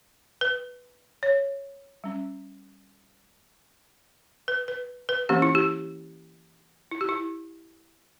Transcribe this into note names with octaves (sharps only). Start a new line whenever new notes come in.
B4
C#5
G3 C#4
B4
B4
B4
E3 A#3 C#4 G4
E4
G4
E4
G4
E4